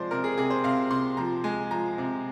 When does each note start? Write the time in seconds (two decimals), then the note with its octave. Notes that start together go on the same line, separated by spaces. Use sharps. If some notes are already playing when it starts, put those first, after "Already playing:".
Already playing: C3 F3 G#3 C5 D5
0.11 C3 A#4
0.24 G#4
0.38 C3 G#4
0.50 C5
0.64 C3 F5
0.91 C3 C6
1.17 F3 A#5
1.44 G#3 G#5
1.71 F3 A#5
1.98 C3